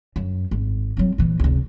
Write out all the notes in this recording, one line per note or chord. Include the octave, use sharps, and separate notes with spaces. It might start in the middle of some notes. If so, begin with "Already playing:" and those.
F#2
G#1
F#3 C4
A#2 E3
F1 C#2